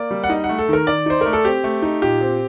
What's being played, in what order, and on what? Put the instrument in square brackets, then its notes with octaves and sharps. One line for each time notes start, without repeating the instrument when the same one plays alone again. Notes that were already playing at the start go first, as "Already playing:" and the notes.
Already playing: [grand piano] A#3 D5
G3
F#5
D#4 D#5
F#5
A3
A4
D#3 A#4
D#3 D5
D#4 C5
A3 A#4
A4
C4 G4
A3
D#4
A#2 G4
C4